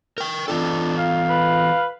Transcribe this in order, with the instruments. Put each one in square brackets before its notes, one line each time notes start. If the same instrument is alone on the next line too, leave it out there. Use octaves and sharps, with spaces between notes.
[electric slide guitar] A#4 G5
[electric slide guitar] E3 F4 A4 [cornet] D4
[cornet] F5
[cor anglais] B4